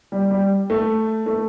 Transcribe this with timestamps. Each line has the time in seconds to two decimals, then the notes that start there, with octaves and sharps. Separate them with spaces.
0.12 G3
0.30 G3
0.70 A3
1.26 A3